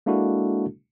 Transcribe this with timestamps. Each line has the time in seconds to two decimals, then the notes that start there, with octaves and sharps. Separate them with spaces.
0.06 G#3 A#3 D4 E4 F#4 A4